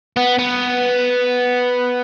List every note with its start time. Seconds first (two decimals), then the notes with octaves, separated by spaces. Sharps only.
0.16 B3
0.39 B3